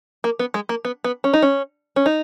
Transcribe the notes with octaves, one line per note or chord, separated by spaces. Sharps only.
A#3
B3
G#3
A#3
B3
B3
C#4
D#4
C#4
C#4
D#4